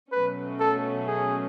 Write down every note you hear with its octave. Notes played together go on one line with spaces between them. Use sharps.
B2 F#3 A3 C#4 B4
A4
G#4